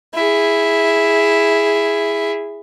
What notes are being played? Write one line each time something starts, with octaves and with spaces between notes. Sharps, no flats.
E4 G#4